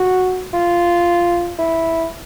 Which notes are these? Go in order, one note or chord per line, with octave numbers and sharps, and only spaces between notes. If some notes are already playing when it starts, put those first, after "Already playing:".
Already playing: F#4
F4
E4